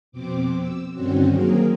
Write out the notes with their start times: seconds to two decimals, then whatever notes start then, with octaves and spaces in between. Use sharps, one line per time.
0.12 F2 B2 C4 D6
0.58 E6
0.92 G2 D3 D#3 C4 C#4 F#4
1.29 F#3 A#3 C4 G#4 A#4